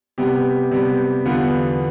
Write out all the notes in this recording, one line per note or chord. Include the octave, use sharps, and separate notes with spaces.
C3 G3 B3 G4
C3 G3 B3
E2 D3 G3 B3 F4